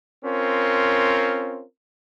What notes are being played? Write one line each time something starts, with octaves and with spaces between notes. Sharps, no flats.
C4 C#4 F4 A#4